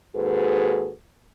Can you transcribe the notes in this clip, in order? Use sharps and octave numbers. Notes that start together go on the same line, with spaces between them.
D#2 G#2 F#4 G#4 A4 B4